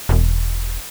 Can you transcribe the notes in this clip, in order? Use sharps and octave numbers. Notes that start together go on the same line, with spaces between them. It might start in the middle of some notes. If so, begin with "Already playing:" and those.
E1